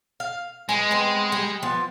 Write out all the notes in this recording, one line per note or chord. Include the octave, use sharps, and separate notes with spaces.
F5
G#3 B4 G#5
B3 C4
G3
F3 B3